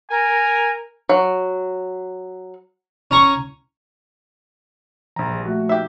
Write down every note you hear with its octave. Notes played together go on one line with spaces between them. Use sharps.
A#4 G#5
F#3
C#4 A#5 C#6
A#1 F3 G3 A#5
A#2 F3 G3
F3 A3 F#4
D#4 G4 E5